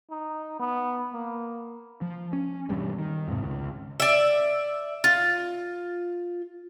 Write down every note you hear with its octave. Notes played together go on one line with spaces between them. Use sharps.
D#4
B3
A#3
F3
C#4
E1 E2 G2 G3
D#3
E2 G#2 C3
C#2
D5 E5
F4